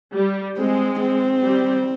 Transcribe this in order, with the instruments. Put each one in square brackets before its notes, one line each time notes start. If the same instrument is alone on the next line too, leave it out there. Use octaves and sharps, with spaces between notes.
[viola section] G3
[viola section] G#3 [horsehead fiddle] C4
[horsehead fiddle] C4
[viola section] G3